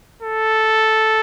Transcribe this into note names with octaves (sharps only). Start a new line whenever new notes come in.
A4